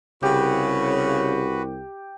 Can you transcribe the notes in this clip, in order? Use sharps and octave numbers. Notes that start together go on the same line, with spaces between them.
C2 C#3 F#4 G4 B4